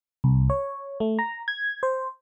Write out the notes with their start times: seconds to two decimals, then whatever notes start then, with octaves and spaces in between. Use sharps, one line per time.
0.24 C2
0.50 C#5
1.00 A3
1.19 A#5
1.48 G#6
1.83 C5